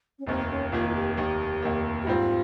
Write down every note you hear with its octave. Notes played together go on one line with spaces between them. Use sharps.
C#4
F1 D#2 D#3 A#3 C4
C#4
F1 D#2 D#3 A#3 F4
F4
G4
F1 D#2 D#3 A#3 G4
F1 D#2 D#3 A#3
G4
G#2 G3 C4 F4